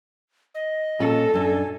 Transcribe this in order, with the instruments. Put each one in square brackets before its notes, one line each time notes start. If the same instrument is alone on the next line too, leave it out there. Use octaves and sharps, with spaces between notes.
[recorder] D#5
[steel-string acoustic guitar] A#2 C#4 [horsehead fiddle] A4
[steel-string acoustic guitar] F#2 D4 [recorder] G#5